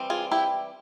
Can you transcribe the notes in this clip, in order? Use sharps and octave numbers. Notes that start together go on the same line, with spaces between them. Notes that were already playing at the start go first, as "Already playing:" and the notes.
Already playing: E3 G3 C4
F4 G#4
E4 G4